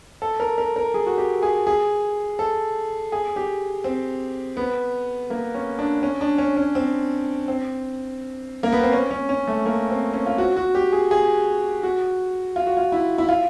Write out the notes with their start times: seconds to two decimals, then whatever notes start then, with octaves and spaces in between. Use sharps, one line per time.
0.22 A4
0.40 A#4
0.58 A#4
0.76 A#4
0.94 G#4
1.06 F#4
1.18 G4
1.43 G#4
1.67 G#4
2.39 A4
3.12 G#4
3.36 G4
3.84 C4
4.57 B3
5.30 A#3
5.54 C#4
5.79 D4
6.03 C#4
6.21 D4
6.38 C#4
6.57 C#4
6.75 C4
7.48 C4
8.63 A#3
8.72 B3
8.83 C4
8.92 C#4
9.11 C#4
9.29 C#4
9.47 A3
9.66 A#3
9.90 C4
10.13 C#4
10.26 F4
10.38 F#4
10.57 F#4
10.75 G4
10.92 G#4
11.11 G#4
11.83 F#4
12.56 F4
12.67 F#4
12.77 F4
12.92 E4
13.18 E4
13.29 F4